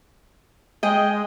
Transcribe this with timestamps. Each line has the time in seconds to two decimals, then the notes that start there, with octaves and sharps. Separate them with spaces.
0.83 G#3 G#4 D#5 G5